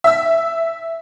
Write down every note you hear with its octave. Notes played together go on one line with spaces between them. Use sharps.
E5 E6